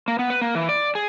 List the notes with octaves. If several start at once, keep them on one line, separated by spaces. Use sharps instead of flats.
A#3
B3
B4
A#3
E3
D5
G#4